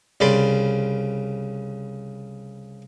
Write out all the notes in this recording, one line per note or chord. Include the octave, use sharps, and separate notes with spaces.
C2 C#3 D5 B5 C6